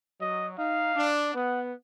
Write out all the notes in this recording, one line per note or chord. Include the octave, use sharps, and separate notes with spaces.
F#3 D#5
D#4 F5
D4
B3 F#5